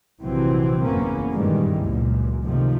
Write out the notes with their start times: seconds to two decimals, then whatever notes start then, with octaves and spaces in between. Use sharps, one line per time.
0.20 A#1 C3 E3 F#3 C4
0.83 F#1 E2 C#3 A#3 B3 C#4
1.32 G2 A#2 D#3 E3 G3 G#3
1.81 C#2 F#2 A#2
2.44 F#2 C3 D#3 F3 A3